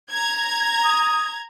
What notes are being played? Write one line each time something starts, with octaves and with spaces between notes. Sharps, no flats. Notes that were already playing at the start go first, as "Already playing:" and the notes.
A#5 G#6
D#6